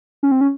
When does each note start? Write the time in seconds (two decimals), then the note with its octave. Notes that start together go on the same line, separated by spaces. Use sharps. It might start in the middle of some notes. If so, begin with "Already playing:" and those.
0.23 C#4
0.31 C4
0.41 C#4